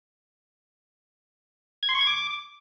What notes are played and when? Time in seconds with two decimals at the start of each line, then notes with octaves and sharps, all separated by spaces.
1.83 G#6
1.89 C6
1.95 C#6
2.01 G#6
2.07 D6